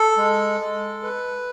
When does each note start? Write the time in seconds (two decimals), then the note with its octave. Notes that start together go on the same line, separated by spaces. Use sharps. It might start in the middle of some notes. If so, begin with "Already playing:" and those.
Already playing: A4
0.18 G#3
0.60 G#3
1.03 B4